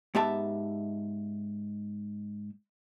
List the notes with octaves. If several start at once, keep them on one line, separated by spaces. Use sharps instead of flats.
G#2 B3 G4 E5 A5